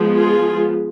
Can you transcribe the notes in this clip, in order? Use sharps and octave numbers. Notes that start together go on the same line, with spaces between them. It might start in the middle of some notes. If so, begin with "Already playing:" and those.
Already playing: F3 G#3 B3
F4 G#4